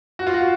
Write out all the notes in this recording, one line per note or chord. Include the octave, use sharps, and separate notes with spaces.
F#4
F4
F#4